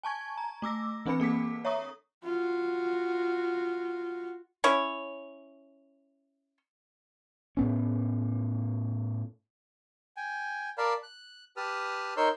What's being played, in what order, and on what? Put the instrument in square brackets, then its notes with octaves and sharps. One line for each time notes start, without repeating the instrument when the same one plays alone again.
[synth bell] G#5 A5 C#6 G#6
A#5
A3 D6 E6 A#6
E3 C4 D4 B4 B5 C#7
A#3 A4 D6 B6
C#5 E5 A#5 C#6 D#6
[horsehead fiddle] F4 F#4
[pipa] C#4 E4 C#5
[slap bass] A2 B3 C#4
[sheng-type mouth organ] G5 G#5
A#4 D5 F5 A5 B5
F#6
G4 B4 A5 D#6 F6
D#4 A#4 C#5 C6 E6 G6